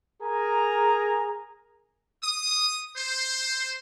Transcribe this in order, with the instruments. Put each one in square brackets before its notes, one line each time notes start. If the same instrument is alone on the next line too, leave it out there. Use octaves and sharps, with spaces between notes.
[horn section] G#4 A#4 G#5 A#5
[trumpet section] D#6
C5